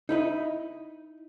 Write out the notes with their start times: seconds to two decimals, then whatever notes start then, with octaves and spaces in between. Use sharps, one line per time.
0.09 D#4 E4 D#5